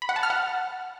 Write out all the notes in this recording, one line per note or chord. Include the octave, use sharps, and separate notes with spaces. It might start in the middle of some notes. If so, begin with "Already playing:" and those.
B5
F#5
A5
F6
F#5